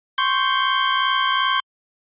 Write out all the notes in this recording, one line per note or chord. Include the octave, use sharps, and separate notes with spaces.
C6 C#6 G6